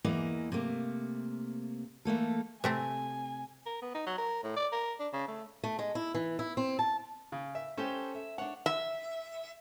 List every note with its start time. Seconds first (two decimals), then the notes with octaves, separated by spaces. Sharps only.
0.04 E2 E3 A#3 E4 D#5
0.52 C3 A3 A#3
2.05 E3 A3 A#3 A4
2.64 C3 A3 C4 G#5
3.66 A#4
3.82 B3
3.95 D#4
4.07 F#3
4.18 A#4
4.44 A2
4.56 D5
4.72 A#4
5.00 D4
5.13 C#3
5.28 A3
5.64 A3
5.79 G#3
5.95 E4
6.15 E3
6.39 E4
6.57 C4
6.79 A5
7.32 C#3
7.55 E5
7.77 C#4 G4 A4 C5
8.15 E5
8.38 D4 C#5 F#5
8.66 E5